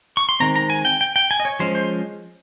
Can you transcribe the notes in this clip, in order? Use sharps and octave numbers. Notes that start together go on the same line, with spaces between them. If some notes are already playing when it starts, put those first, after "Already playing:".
C#6
C6
D#3 G#3 C4 A#5
A#5
G#5
G5
G5
G5
G#5
D#5
C#5
F3 G#3 C#4 C5
C5